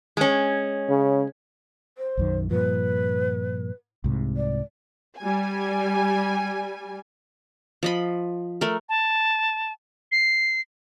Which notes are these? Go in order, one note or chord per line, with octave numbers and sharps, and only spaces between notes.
G#3 C#4
C#3
C5
B1 F#2 D#3
G2 A#2 F3 B4
C2 G#2 C3
D5
G3 G#5
F3 D#5 B5
A3 A#4
A5
C7